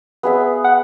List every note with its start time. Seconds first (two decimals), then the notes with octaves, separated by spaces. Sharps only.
0.23 B3 G#4 E5
0.64 F#5